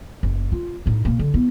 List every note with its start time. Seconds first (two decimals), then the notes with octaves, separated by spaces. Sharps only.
0.23 F#1
0.52 F4
0.86 A2 D#4
1.05 B2 A#3
1.19 D3
1.34 B3 E4